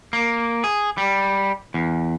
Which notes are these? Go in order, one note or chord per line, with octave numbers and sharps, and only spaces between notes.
A#3
G#4
G3
E2